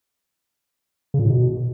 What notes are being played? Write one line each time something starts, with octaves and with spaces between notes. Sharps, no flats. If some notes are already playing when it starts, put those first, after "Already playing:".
C#3
A#2
A2
B2